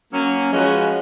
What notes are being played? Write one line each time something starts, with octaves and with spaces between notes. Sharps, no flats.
F#3 A#3 C#4
F3 G#3 C#4 F#4 B4